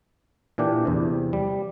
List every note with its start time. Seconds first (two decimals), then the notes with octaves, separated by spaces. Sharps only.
0.58 A#2 E3 D4 G4
0.85 E2 C3
1.33 G3